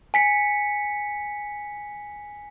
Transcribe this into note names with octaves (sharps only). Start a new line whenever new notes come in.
G#5 B6 C#7